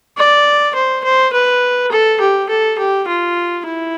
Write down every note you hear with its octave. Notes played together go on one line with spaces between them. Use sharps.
D5
C5
C5
B4
A4
G4
A4
G4
F4
E4